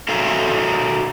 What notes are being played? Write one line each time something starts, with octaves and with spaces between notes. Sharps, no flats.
F#4 A4 A#4 E5 F5 G#5